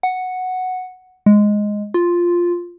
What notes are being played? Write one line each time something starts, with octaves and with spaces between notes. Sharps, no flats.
F#5
G#3
F4